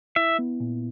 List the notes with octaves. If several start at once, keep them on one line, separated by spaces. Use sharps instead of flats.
E4 E5
B3
A#2